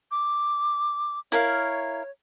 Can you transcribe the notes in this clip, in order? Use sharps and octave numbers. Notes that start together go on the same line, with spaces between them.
D6
E4 A#4 C#5 F5